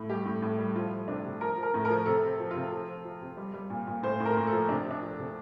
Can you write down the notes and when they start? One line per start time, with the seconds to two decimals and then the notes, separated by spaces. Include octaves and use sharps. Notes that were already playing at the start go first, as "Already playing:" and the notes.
Already playing: A2
0.09 G3 G4
0.26 A2
0.42 A2
0.58 G3
0.75 F3 F4
0.91 F3
1.08 C3 D4
1.24 C3
1.41 F3 A#4
1.57 F3
1.63 A#4
1.74 A2
1.85 F3 A#4
2.06 C3 A4
2.23 C3
2.40 F3
2.51 C3 F4
2.72 F3
2.88 F3
3.05 F3
3.21 C3
3.37 G3
3.54 G3
3.70 A#2
3.87 A#2
4.03 A2 C5
4.20 A2
4.25 A#4
4.37 A2
4.47 F3 A4
4.69 C3 D4
4.85 C3
4.91 D4
5.02 F3
5.18 C3